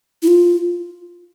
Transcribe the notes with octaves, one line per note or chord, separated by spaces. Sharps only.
E4
F4